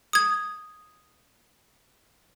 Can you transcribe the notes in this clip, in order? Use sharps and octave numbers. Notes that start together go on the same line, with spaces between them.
D#6 G#6